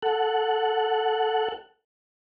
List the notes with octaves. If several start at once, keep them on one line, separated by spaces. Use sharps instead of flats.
A4 F#5